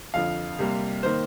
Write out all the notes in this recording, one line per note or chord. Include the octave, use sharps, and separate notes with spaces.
F2 D3 F3 F5
C3 G3 A#3
D#3 A#3 C5